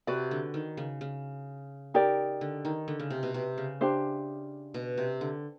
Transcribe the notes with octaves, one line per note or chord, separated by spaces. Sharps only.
C3 F#4 B4 D5
D3
D#3
C#3
C#3
D#4 G4 A#4 D5
D3
D#3
D3
C#3
C3
B2
C3
C#3
D4 G4 C5 E5
B2
C3
D3